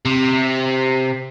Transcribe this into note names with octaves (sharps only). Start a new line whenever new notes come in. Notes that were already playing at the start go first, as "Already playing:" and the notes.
C3